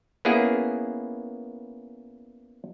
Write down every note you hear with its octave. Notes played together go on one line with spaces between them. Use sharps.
A#3 B3 C#4 E4 G#4